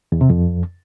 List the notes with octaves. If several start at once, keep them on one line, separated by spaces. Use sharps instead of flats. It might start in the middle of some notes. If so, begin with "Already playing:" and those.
E2
C3
F2